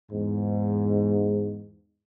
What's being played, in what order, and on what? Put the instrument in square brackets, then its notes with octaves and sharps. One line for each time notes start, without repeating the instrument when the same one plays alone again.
[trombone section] E2 G#2